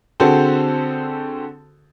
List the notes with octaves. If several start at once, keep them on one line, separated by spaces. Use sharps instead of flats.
D3 C4 F#4 G#4 A4 C5